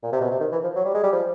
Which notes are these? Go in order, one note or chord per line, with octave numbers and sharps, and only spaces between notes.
A#2
C3
B2
C3
D#3
E3
F3
F#3
G3
G#3
G3
F3